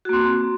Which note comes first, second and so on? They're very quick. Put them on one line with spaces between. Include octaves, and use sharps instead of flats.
F#4 A#3 C4